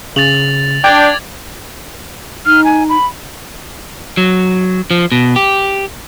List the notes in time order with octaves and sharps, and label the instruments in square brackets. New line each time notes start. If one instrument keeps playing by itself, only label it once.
[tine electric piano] C#3 [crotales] A6 F7 F#7
[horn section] D4 [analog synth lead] G5 [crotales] D6 G#6 A6
[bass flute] D#4 [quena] F6
[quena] G#5
B5
[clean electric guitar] F#3
F3
B2
G4